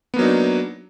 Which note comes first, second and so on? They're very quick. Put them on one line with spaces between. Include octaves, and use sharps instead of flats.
B3 A#3 F#3 D#4 D4